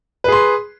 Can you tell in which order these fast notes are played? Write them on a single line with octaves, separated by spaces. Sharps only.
B4 G#4 C6